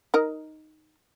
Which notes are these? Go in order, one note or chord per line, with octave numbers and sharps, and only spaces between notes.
D#4 A#4 D#5